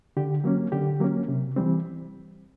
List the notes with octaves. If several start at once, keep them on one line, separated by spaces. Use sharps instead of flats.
D3 G4
F#3 A#3 C#4
D3 G4
F#3 A#3 C#4
C3
E3 G3 C4